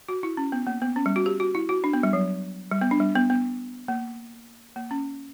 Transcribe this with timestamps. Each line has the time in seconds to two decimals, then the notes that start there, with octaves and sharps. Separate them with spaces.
0.09 F#4
0.23 E4
0.37 C#4
0.52 B3
0.67 A#3
0.82 B3
0.96 C#4
1.06 G3
1.16 F#4
1.26 G4
1.40 F#4
1.55 E4
1.69 F#4
1.84 D4
1.93 B3
2.03 G3
2.13 F#3
2.71 G3
2.81 B3
2.91 D4
3.00 G3
3.15 B3
3.30 B3
3.88 A#3
4.76 A#3
4.91 C#4